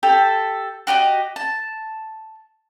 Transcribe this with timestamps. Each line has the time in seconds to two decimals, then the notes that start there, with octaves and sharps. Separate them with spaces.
0.03 G4 A4 E6
0.87 F#4 G4 D5 D#5
1.36 A5